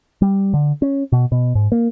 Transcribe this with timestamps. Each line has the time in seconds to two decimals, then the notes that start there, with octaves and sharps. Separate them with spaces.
0.22 G3
0.54 D3
0.82 C#4
1.12 B2
1.32 B2
1.55 G#2
1.72 A#3